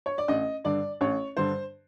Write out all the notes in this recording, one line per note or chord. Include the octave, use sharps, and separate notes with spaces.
C#5
D5
A1 D#5
G2 D3 D5
A1 C#5
G2 D3 C5